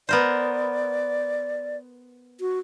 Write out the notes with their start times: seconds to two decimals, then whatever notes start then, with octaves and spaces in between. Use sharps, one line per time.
0.09 B3 A#4 C5 D5
2.40 F#4